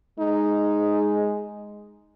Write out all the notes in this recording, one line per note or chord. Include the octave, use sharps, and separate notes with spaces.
G#3 D#4